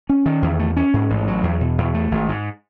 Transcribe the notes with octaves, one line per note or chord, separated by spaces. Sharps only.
C#4
D#3
E2
A3
C#4
G#2
A1
F#3
E2
B2
E2
A3
G#1
G#2